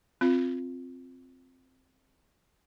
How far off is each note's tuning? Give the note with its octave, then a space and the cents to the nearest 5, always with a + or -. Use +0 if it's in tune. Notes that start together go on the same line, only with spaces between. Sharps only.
C4 +0 F4 +15